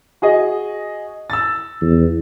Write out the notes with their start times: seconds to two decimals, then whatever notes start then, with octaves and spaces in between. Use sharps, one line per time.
0.22 F#4 G#4 D#5
1.30 E6 A6
1.81 E2